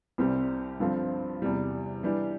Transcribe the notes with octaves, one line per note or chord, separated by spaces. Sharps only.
C2 C3 G3 C4 G4
G2 D3 F3 C4 F4
E2 C3 G3
E3 G3 D4 G4